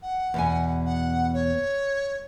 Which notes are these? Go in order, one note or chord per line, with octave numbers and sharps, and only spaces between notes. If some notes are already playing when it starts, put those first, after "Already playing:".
F#5
E2 B2 G#5
F#5
C#5